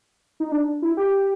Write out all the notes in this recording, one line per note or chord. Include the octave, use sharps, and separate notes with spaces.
D#4
D4
E4
G4